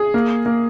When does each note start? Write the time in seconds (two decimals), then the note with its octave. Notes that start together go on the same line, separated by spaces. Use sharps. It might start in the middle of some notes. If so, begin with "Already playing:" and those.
Already playing: G#4
0.14 A#3
0.46 A#3